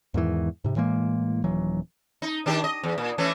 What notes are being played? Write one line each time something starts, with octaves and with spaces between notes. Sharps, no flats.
E2 G#2 D#3 E3
G#2 C3
A2 E3 G#3 A#3
D#1 E3 F#3
D#4
D#3 D4 G4
D#5
E2
A#2
E3 A3 C#4